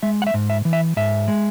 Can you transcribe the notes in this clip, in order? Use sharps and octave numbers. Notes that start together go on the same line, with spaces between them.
G#3 E5
F#5
E5
G#2
E5
E3
E5
G#2 E5
G#3